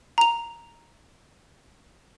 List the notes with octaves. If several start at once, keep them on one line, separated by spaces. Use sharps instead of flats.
A#5 F7